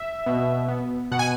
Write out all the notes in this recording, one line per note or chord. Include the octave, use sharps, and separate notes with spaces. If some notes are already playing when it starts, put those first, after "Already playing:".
Already playing: E5
B2
B3
B2 F#5
G#5